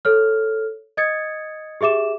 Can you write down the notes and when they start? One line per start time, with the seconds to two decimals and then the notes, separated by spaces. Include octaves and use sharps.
0.05 A4 C#5 F6
0.97 D#5 D#6 G#6 A6 C#7
1.81 G4 G#4 E5 D6 E7